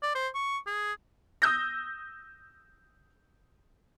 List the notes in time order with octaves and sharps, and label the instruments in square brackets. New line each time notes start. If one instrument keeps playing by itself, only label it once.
[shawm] D5
C5
C#6
G#4
[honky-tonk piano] D#6 E6 G6 A#6